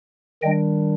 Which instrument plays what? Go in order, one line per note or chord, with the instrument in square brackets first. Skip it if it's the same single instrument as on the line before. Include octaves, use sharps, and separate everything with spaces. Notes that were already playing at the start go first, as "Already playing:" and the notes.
[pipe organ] D#3 G3 D4 D#5 G5